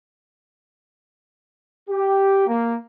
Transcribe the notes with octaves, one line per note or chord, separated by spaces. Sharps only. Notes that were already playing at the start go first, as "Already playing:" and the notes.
G4
A#3